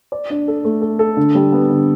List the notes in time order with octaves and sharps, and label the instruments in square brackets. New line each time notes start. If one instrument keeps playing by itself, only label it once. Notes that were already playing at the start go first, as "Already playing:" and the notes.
[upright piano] D5
D4
A4
A3
A4
A4
D3
G3
B3
D3